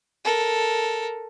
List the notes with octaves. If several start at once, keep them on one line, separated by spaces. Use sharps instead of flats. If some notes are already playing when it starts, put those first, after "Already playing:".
A4 A#4